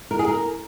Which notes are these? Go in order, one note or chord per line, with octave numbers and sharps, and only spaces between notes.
A#4
G#4
A#4